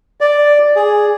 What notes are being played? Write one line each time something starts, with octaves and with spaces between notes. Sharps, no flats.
D5
G#4